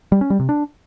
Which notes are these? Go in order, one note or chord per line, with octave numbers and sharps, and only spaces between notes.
G3
C#4
G3
C3
D4